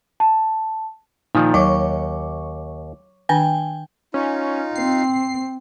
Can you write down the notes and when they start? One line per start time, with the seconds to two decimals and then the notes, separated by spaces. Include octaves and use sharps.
0.20 A5
1.35 A#2 D#3 F3 D#4
1.54 D#2 F#3 C#5 C#6 D6
3.29 D#3 D4 G5 G#5
4.14 C#4 D#4 F4
4.76 C4 C7